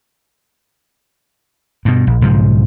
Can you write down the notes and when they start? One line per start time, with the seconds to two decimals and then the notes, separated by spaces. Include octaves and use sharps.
1.85 G2 B2
2.07 A#1
2.21 B1 G#2 C#3 F3